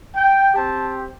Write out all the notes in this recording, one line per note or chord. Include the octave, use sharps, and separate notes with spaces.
G5
C4 G4 A5